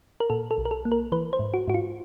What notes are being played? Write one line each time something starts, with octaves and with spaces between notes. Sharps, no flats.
A#4
A#2 A4
A4
B1
A#4
A4
A#3
A#4
E3 B4
C5
G#2
F#4
G#2 F#4
F4